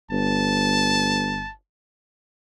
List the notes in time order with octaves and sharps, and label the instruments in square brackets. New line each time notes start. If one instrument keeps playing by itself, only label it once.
[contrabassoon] G1 [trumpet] A5